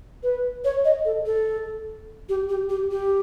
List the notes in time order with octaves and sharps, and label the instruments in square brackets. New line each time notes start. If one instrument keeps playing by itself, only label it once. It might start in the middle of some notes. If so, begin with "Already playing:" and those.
[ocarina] B4
C#5
D#5
A4
A4
G4
G4
G4
G4